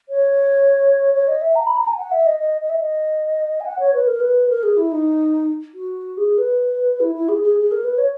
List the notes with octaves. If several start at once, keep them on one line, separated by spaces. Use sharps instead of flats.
C#5
C#5
D#5
E5
A#5
B5
A#5
G#5
F#5
E5
D#5
D#5
D#5
E5
D#5
G#5
F#5
C#5
B4
A#4
B4
A#4
G#4
E4
D#4
F#4
G#4
B4
E4
E4
G#4
G#4
G#4
A#4
B4
C#5